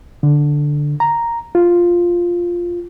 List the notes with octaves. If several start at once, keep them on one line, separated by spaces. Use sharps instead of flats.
D3
A#5
F4